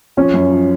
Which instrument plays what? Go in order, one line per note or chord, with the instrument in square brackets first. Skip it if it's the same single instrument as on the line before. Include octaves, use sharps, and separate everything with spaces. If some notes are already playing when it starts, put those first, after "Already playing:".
[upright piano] F3 [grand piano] C#4
[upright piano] F#2
F3